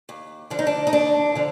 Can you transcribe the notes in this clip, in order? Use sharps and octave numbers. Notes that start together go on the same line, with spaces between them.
D#2
D3 F3 D4
D#4
D4
D#4
D#2 D4
D3 F3